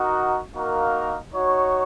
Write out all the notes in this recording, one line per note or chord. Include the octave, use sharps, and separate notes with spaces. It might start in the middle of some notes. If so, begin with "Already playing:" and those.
Already playing: D#4 F#4 A#4 D#5 F#5
A#3 D#4 F#4 A#4 F5
D#4 F#4 C#5